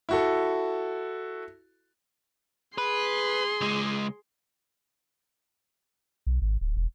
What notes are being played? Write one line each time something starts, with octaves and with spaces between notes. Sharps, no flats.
E4 F#4 A4
G#4 B4 C6
C#2 G#3
B1
G#1
D1
E1